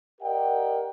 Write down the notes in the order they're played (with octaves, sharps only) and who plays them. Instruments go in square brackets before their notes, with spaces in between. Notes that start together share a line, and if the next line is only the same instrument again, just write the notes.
[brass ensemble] G4 A#4 D5 D#5 F#5 G5